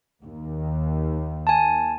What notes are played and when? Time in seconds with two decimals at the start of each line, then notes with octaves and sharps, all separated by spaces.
0.24 D#2
1.47 G#5 A5